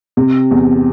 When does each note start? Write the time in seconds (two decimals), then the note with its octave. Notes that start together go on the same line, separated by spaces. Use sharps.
0.17 C3
0.51 E2